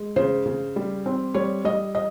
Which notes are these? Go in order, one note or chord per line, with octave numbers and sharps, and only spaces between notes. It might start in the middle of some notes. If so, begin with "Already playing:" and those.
Already playing: G#3
C#3 C5
C#3
G3
C4
G3 C#5
G3 D#5
D#5